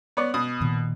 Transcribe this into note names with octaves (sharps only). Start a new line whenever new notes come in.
B3 C#5 D5
B2 D#6
A#2 D#3